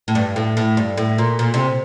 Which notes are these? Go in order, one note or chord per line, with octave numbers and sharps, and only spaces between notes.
A2
G2
A2
A2
G2
A2
A#2
A#2
C3